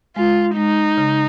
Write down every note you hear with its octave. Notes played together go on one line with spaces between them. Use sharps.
G#3 F4
G#3 D#4
C#3